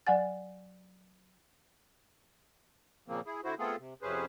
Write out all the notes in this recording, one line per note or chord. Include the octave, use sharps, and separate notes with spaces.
F#3 D5 F#5 G#5 A6
A#2 C#3 F3 A#3 C4
E4 G#4
D3 E4 F#4 C5
A3 B3 C4 F4 G#4 A4
C3
F2 C3 C#4 G#4 B4 C5